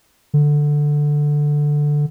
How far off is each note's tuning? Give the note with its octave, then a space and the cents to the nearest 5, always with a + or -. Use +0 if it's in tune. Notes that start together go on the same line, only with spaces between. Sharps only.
D3 +5